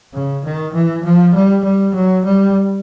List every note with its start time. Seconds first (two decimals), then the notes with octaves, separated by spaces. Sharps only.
0.14 C#3
0.44 D#3
0.74 E3
1.04 F3
1.34 G3
1.64 G3
1.94 F#3
2.25 G3